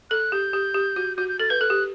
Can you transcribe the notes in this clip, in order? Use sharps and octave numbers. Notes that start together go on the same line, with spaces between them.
A4 F#6
G4 G6
G4
G4
F#4
F#4 G6
G6
A4 A6
B4 G6
A4 F#6
G4